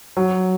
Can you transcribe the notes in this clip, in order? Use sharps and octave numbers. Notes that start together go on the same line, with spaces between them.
F#3